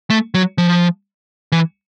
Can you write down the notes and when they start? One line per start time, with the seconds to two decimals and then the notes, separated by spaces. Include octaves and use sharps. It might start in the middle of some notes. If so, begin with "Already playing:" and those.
0.10 A3
0.34 F#3
0.58 F3
1.52 E3